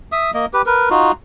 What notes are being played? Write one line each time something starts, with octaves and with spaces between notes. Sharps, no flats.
E5 D#6
A#3 D#5
G4 B4
A#4 B4
D#4 F4 F#4